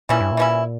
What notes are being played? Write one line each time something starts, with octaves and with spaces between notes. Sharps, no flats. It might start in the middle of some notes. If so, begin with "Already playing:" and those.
A#2 E3 G3 C#4 E4
G2
A#2
E3 G3 C#4 E4